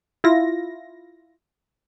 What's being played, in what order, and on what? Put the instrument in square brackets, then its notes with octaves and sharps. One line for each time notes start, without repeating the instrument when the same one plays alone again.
[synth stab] E4 F4 A#6